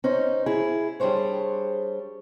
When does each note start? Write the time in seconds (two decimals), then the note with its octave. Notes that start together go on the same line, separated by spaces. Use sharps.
0.04 C#4 D#4 C5
0.46 E4 G#4
1.00 G3 D4 G#4 C5 C#5